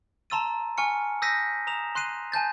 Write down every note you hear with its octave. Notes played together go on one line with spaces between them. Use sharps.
A5 A#5 C6 E6 A6 D#7
G#5 C#6 F6 C#7
D#6 E6 G6 A#6 B6 D#7
A#5 D#6 E7 F7
C6 F#6 C7 D#7
G#5 A5 G6 A6